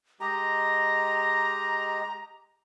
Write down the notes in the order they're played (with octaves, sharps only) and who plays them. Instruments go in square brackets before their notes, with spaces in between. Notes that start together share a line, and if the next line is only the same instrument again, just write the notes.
[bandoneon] G#3 G4 D#5 [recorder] A#5